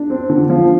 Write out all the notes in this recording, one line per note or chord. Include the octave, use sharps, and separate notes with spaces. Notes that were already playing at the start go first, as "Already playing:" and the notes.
Already playing: D4
C4
D3
F3